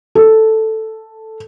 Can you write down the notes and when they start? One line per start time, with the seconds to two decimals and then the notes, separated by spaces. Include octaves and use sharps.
0.15 A4